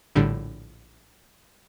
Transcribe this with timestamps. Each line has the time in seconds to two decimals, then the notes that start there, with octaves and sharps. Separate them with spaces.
0.15 A#1 A2 D3 G3